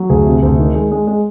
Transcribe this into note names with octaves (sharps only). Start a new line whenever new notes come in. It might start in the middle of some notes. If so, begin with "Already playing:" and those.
Already playing: F#3
D2 G#4
C3
D2
D#3
G#3
G#3
G#3